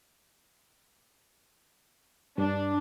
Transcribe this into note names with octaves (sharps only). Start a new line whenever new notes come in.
G2 D4